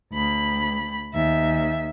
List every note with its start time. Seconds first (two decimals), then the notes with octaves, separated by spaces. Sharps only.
0.13 D2 B5
1.12 D#2 E5